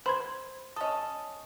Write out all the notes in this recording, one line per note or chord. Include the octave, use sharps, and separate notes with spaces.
C5 B5 C6 G#6
C#4 A4 D#5 D#6